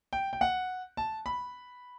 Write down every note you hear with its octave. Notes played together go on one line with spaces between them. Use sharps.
G5
G5
F#5
A5
B5